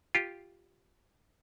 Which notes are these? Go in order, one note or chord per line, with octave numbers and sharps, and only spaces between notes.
F4 G4